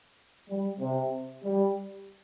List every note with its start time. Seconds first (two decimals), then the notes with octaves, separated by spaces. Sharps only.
0.49 G3
0.80 C3
1.44 G3